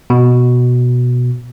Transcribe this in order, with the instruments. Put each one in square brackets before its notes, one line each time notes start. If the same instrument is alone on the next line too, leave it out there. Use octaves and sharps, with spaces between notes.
[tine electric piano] B2